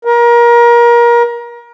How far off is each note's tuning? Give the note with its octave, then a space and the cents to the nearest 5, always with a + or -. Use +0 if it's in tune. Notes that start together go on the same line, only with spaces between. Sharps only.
A#4 +30